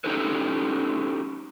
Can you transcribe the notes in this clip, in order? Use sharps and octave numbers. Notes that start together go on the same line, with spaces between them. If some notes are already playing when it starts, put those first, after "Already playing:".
C#4 D#4 E4 G4 A4 B4